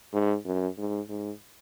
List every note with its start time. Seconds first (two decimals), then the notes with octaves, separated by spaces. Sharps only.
0.13 G#2
0.45 F#2
0.78 G#2
1.09 G#2